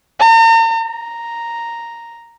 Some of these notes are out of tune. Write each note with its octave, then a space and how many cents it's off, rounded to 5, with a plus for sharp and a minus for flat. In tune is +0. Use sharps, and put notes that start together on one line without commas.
A#5 -45
A#5 +0